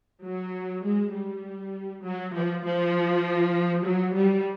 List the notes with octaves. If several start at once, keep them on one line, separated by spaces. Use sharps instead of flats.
F#3
G#3
G3
F#3
F3
F3
F#3
G3